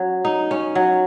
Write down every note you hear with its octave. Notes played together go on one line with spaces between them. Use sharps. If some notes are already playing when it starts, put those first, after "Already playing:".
Already playing: F#3 C#4
D#4
C#4
F#3